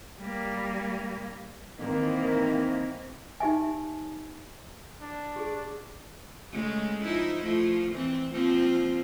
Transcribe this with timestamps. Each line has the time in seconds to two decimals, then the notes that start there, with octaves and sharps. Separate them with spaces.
0.21 G3 A#3
1.80 D#3 E3 A#3 C4
3.40 D#4 G4 E5 G#5
5.01 D4
5.36 G4 G#4
6.52 C#3 G#3 A3
7.04 F3 D#4 E4
7.43 F3 A3
7.92 E3 C4
8.33 F3 A#3 C4